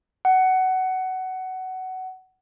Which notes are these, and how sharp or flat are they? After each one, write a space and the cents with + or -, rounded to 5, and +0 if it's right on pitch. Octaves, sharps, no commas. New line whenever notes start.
F#5 +20